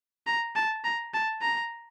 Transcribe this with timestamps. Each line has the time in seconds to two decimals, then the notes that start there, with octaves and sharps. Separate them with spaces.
0.27 A#5
0.56 A5
0.84 A#5
1.14 A5
1.42 A#5